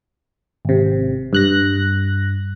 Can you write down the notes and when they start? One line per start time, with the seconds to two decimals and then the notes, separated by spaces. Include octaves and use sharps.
0.65 G#1 C3
1.33 G2 F#6 A#6